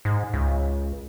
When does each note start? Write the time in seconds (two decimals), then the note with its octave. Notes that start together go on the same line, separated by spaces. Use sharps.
0.05 G#2
0.33 C#2